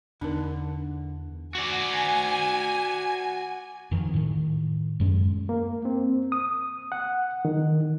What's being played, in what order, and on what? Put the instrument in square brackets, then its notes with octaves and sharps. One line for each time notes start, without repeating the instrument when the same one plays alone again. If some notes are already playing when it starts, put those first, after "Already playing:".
[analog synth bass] E2 [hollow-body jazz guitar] D3 [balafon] D4 D#4 A#4
[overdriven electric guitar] F#4 D5 [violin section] G#5
[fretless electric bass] F2 D#3 F3
A2 D#3
F#2 G#3 C#4
[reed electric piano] A#3
C4
D#6
F#5
D#3